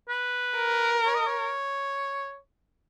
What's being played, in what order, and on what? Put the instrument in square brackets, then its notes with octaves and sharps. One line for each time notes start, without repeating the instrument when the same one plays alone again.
[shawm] B4
[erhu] A#4
[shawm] C#5
D#5
C#5